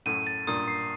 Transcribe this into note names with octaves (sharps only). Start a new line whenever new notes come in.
F#2 A2 D#7
A6
G2 A#2 D#6
C7